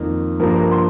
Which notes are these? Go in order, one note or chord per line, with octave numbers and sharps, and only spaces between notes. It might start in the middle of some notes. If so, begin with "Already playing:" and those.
Already playing: F2 D#3 A#3
G2 F3 A#3 A#4
A#4
A#4
C6